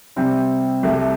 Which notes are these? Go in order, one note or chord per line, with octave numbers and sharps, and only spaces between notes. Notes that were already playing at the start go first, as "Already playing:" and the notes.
C3 G3 C4
C2 C3 A3